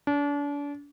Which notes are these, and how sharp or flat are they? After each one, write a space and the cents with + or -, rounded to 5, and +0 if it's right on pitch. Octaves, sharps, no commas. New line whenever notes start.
D4 -35